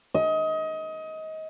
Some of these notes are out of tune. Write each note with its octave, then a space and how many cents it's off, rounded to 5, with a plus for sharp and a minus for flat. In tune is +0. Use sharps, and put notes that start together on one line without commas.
D#5 +25